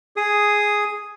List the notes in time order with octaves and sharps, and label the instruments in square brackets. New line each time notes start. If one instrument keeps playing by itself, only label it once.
[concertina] G#4 D#6